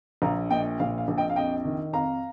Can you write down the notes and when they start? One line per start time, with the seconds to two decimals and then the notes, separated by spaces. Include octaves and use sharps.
0.22 A#1 F5 A#5
0.50 A#2 D#5 G5
0.80 A#1 F5
0.98 F5
1.08 A#1
1.17 D#5 G5
1.30 F5
1.36 F2 D#5 G5
1.65 D#3
1.93 F2 F5 A#5